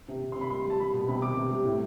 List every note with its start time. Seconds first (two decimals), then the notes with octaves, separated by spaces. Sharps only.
0.08 C3
0.22 C3
0.32 C6
0.36 C3
0.41 B5
0.50 G3 C6
0.65 G3 A5
0.80 G3 B5
0.93 B2
1.08 C3 B5
1.22 C3 D6
1.37 C3
1.51 G3
1.65 A2